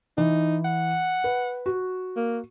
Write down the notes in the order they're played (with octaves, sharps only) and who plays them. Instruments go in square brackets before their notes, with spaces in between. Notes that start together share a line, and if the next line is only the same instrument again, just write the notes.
[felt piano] E3 [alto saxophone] D#4
[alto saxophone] F#5
[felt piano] B4
F#4
[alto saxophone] A#3